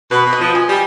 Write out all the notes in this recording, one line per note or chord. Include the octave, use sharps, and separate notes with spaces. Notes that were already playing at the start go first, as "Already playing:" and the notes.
B2 B4
B2
D#5
F3
G#5
G3